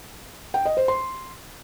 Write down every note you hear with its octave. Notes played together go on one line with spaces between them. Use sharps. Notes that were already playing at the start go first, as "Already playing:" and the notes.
G5
D#5
C5
C6